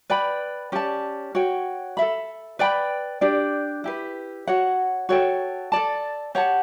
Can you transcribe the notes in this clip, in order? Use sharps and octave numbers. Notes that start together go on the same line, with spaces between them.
B4 D5 G5 B5
C#4 G4 D5 A5
F#4 C#5 G5
A4 E5 B5
B4 D5 G5 B5
D4 G4 D5
E4 G4 B4
F#4 C#5 F#5
F#4 A4 C#5 G5
A4 D5 A5
G4 C#5 F#5 A5